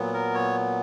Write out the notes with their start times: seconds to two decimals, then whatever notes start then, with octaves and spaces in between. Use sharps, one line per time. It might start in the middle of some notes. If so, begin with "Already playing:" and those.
Already playing: A#2 F#3 B3
0.14 A#4
0.35 C#5